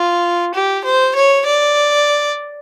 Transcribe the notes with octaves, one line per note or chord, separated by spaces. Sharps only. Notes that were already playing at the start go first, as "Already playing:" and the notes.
Already playing: F4
G4
C5
C#5
D5